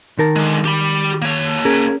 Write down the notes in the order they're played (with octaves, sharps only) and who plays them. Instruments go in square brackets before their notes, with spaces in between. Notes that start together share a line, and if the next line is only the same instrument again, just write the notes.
[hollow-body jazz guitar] D#3 A#4 A5
[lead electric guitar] D3 G#3
G4 B5
A#3 C#5
[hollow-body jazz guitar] C#4 G#4 A#4